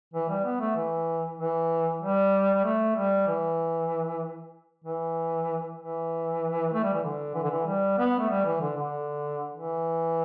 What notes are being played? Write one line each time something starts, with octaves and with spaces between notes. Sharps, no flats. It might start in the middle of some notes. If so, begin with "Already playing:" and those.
E3
G3
B3
A3
E3
E3
G3
G3
A3
G3
E3
E3
E3
A3
G3
E3
D3
E3
D3
E3
G3
B3
A3
G3
E3
D3
D3
E3